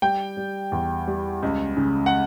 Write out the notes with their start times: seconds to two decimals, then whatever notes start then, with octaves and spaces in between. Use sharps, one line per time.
0.02 G3 G5
0.37 G3
0.72 E2
1.08 G3
1.43 C#2
1.77 C#3
2.06 F#5